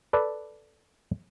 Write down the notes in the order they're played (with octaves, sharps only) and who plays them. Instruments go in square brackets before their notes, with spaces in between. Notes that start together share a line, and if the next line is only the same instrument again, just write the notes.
[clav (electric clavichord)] A4 B4 D5